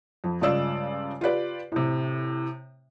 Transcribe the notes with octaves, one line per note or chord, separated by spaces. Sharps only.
F2
G2 C#3 G#3 F4 D5 E6
F4 G4 B4 D5
A2 C3